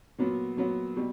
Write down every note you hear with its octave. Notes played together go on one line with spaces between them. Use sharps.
A#2 F#3 B3
A#2 F#3 B3
B2 G3